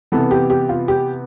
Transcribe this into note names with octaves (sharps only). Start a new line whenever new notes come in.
C3 E3 B3 A4
G4
G4
F4
G4